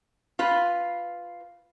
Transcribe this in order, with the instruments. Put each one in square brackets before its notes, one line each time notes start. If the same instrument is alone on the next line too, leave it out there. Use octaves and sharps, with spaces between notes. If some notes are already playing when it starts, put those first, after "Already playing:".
[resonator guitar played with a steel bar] F4 B4